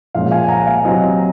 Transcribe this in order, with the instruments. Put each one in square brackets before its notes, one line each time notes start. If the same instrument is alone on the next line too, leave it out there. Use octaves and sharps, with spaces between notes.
[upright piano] A#2 F3 G#3 C#4 [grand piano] F5
[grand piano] F5 G#5
G#5
F#5 A#5
F5 G#5
[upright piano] C3 F#3 C4 [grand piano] D#5